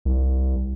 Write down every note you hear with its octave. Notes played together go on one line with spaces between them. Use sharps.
C2